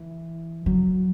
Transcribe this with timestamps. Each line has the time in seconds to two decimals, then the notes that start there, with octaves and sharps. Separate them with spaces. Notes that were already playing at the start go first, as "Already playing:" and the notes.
Already playing: E3
0.66 F#3